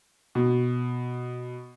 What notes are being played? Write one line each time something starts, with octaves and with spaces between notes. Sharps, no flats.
B2